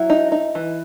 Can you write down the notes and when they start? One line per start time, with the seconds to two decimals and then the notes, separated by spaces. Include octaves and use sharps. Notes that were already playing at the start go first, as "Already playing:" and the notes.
Already playing: F#3 E4
0.10 D#4
0.32 D#4
0.55 E3